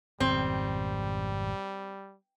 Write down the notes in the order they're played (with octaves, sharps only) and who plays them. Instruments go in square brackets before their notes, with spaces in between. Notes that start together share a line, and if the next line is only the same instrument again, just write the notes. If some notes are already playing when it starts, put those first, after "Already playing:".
[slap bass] G#1 F2 B2 [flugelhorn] G3 [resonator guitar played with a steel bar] C4